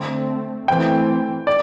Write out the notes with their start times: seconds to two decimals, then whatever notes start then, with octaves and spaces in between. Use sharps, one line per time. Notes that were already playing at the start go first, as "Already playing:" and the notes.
Already playing: D3 A3 C4
0.68 E3 A3 C4 G5
1.47 D5